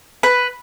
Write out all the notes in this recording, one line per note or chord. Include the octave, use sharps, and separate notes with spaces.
B4